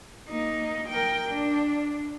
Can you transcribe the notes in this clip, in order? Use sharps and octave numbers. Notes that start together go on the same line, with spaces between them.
A#3 D#4
A#4 G5
D4